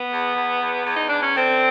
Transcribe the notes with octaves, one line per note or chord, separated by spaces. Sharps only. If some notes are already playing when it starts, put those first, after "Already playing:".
Already playing: B3
E2
E2
E2
E2
D#4
E2 D4
C#4
D3 C4